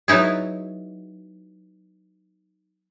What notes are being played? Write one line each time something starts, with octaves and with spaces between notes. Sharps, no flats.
F#3 B3 D#4 E4 G#4